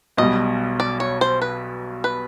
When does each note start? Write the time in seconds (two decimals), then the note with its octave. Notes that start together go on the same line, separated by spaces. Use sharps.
0.17 B1 B2 G3 D#5
0.80 D5
1.00 C#5
1.21 C5
1.42 B4
2.04 B4